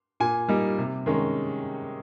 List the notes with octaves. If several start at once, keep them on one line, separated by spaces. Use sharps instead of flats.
A#2 G#5
G3 A#3 D#4
C3
D#3 G#3 C#4